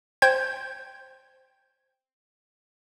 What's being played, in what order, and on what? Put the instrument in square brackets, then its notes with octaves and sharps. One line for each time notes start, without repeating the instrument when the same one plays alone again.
[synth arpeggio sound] C5 G5 G6 G#6